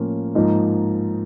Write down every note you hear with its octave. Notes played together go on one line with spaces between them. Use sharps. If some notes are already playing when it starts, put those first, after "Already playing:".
Already playing: A2 F3 A#3 C#4 F4
G#2 F3 A#3 D#4